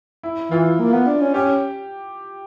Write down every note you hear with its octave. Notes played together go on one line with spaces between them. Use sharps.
E4
E3 F4
A#3
B3
D4
C#4
C#4 G4